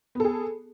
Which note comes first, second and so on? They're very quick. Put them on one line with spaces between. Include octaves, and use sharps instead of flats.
B3 A4 G#4